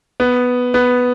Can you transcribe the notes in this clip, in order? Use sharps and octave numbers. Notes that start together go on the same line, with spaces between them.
B3
B3